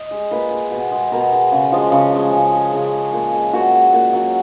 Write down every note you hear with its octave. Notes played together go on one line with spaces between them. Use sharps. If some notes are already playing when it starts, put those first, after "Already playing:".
Already playing: D#5
G#3
A#2 B4
G#3
B2
G#3
B2 A#4
G#3
C#3
F3 G#3
C#3
F3 G#3
C#3
G#3
C#3 G#4
G#3
A#2
G#3
A#2 F#4
G#3
A#2
F#3